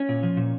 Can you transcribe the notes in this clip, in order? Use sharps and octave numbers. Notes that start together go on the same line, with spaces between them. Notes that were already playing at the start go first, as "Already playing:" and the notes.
Already playing: C#4
A#2
F3
A#2